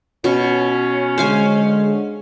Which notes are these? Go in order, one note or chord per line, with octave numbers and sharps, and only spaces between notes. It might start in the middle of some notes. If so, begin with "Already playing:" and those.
B2 C#4
D3 G#3 C5 F5 G#5